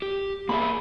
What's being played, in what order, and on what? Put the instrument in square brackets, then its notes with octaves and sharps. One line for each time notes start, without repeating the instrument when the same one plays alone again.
[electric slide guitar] G4
[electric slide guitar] A#3 G#4 E5 [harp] B5